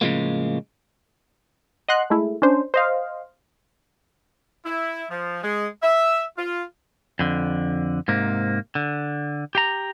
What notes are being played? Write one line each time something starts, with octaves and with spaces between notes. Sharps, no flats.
A2 C#3 E3 F3 G#3 A#3
D#5 F#5 C6 F#6
G#3 A3 E4
C#4 D4 C5
C5 D#5 F5
E4
F3
G#3
E5
F4
F2 D3
G#2 C3 A#3
D3
G4 A#5